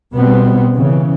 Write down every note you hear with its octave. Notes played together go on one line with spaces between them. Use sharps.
B2 G3 B3 C4
C#3 E3